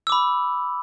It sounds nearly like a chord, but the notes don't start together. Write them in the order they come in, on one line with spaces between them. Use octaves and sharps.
E6 D6 B5